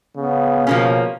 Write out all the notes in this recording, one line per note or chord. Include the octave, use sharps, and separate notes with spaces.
C#3 B3
B2 F3 A#3 C#4